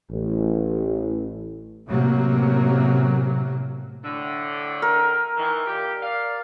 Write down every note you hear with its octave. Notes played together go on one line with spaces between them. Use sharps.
A1
A1 C3 F#3 A#3
A2 D3
A#4
D#3 E3
A#2 G4
D5 F5